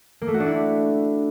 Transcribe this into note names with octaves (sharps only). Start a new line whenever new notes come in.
A#3
A3
F#4
D4
E4